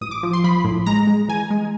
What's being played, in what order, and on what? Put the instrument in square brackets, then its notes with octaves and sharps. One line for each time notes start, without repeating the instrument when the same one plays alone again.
[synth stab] A1 D#6
D6
F3
C6
F3 B5
A2
G#3 A#5
G#3
E3 G#5
G#3